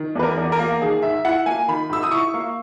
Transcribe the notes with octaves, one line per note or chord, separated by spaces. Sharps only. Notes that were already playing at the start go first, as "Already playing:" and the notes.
Already playing: D#3
E2 B4
A#4
E2
A#4
A#3
D#3 G#4
G#2 E5
E4 F#5
A#3 G#5
D#3 B5
G#2 E6
D#6
E4 C#6
A#3